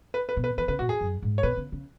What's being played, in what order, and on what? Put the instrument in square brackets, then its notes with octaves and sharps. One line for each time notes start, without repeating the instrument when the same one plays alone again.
[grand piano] B4
B4
[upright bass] B2
[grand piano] B4
[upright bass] E3 [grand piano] B4
[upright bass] C#3 [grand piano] B4
[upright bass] B2 [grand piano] F#4
[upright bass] E2 [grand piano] G#4
[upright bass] F#2
G#2
[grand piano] C#5
[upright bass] B2 [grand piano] B4
[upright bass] C#3
C#3